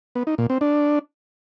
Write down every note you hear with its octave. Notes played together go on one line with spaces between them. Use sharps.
B3
D#4
A#2
C4
D4